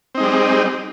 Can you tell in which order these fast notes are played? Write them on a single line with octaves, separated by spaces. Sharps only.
C4 D#4 G#3 G3